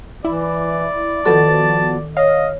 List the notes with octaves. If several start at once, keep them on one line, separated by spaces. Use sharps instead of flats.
E3 E4 D5
D#3 F3 B3 F#4 A4 A5
C#5 D#5 F5